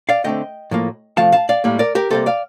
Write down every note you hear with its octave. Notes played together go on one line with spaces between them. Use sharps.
D5 F5
D3 A3 C4 D#5 G5
A2 F3 A#3
C3 F3 A3 F5 A5
F5 A5
D5 F5
A2 G3 A#3
A#4 D5
G4 A#4
C3 G3 A#3 A4 C5
D5 F5